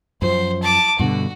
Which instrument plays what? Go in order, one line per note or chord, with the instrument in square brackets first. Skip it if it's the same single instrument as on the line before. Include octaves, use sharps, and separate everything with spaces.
[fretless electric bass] F#2 F3 [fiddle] C5
[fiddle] A5 D6
[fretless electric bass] G2 B2 D3 [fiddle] F#4